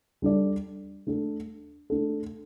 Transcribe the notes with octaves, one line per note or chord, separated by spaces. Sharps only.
G3 D4 A4 D5
A3 D4 A4
A3 D4 A4